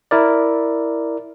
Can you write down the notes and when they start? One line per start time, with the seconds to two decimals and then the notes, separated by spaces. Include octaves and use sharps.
0.11 E4 A#4 D5